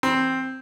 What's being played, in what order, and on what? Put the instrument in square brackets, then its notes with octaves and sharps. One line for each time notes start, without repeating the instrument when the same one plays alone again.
[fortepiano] C4